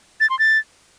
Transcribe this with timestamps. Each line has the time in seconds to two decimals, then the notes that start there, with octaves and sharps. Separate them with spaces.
0.21 A6
0.30 C6
0.39 A6